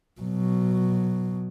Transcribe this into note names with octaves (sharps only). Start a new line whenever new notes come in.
B2 F#3